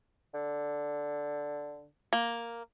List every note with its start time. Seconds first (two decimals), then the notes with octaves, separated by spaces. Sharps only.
0.34 D3
2.13 A#3